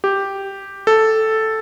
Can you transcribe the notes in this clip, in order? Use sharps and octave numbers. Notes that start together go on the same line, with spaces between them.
G4
A4